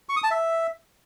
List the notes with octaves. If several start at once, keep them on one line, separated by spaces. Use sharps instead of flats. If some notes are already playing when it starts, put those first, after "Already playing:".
C#6
D#6
A5
E5